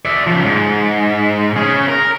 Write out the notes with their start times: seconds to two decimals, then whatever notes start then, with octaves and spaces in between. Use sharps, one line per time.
0.05 D5 E5
0.27 C#3 F3
0.45 G#2
1.56 C#4 G#4
1.88 A#4